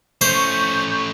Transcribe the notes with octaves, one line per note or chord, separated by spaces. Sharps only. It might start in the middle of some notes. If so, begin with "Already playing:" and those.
A3 C#4 C5 C#6 G6